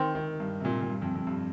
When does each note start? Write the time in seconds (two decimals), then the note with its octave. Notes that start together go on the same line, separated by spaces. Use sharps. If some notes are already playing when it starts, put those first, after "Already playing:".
Already playing: D#3 C4
0.15 D#3
0.40 G2
0.60 C3
0.65 A#2
0.81 A#2
0.90 G2
1.02 F2
1.15 F2
1.27 G2